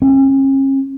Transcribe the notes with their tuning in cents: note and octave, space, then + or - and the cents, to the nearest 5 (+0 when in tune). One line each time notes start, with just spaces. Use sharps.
C#4 -40